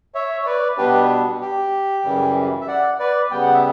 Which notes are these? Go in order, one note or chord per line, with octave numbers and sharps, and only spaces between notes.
C#5 E5
C#5
B4 D5
B2 G3 B3 D4 G4 B4
G4
F#2 C#3 E3 G3
E5
D5 F#5
B4 D5
C#3 G3 B3 G5
F#5
E5